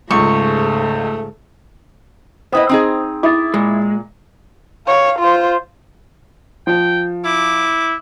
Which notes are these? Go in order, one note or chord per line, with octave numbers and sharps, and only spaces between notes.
C#2 G#2 C#3 A3 C#6
B3 E4 C5 D#5 G5 D#6
C4 D#4 G#4
E4 D6 D#6 A6
A#2 G#3
C#5 F5
F4 C5
F3 G5
E4 D6